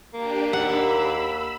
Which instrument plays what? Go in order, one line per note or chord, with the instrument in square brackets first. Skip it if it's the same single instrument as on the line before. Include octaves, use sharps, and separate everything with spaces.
[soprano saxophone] A#3 [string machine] D4 G4
[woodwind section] D#2 [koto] F#5 [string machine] B5 E6